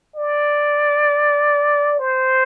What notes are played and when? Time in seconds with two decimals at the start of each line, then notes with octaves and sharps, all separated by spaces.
0.16 D5
2.00 C5